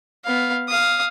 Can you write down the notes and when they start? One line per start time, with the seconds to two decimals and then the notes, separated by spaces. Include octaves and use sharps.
0.25 B3 F5
0.69 F5 D#6